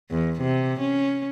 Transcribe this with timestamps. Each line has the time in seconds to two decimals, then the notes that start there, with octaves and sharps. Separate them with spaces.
0.11 E2
0.41 C3
0.80 C#4